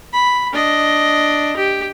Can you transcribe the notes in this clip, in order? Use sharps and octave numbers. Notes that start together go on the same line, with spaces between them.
B5
D4 D#5
G4